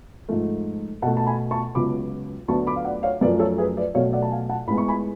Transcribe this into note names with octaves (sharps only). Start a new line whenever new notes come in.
G#2 F3 A3
B2 A3 F#5 A5
A5
G#5 B5
A5 C#6
C#2 C#3 F#3 B3 B5 D6
D2 D3 F#3 B3 A5 C#6
B5 D6
F5
D5 F#5
C#5 F5
F#2 F3 A3 B4 D5
A4 C#5
G#4 B4
B4 D5
B2 F#3 A3 C#5 F5
D5 F#5
A5
F5 G#5
F#5 A5
A2 G#3 B3 B5
C#6
G#5 B5